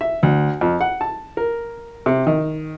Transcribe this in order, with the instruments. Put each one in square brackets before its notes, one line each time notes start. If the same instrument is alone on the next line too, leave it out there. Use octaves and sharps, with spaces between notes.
[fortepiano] E5
D2
F2
F#5
A5
A#4
C3
D#3